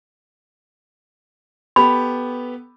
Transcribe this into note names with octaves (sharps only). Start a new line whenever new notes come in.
B3 G4 A4 B5